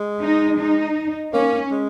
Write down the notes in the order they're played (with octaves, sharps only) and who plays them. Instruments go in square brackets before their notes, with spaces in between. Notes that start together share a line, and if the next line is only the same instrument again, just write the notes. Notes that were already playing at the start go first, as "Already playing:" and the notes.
Already playing: [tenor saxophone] G#3
[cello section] D#4
D#4
[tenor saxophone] A#3 [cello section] C#4
[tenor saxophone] G#3